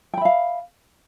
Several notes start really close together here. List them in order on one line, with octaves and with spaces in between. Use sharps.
G5 B5 E5 F5